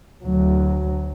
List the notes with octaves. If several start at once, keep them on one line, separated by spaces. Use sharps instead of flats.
D2 F#3